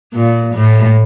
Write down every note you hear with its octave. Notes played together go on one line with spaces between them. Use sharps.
A#2
A2